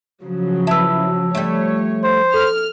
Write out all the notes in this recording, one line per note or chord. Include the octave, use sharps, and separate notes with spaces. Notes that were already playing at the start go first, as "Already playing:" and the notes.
C#3 F3 F#3
E4 B4 A5 E6
F3 G3 A3 C#5
C5
A4 F6